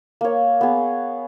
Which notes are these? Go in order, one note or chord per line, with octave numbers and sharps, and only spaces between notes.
A#3 C#5
B3 G#4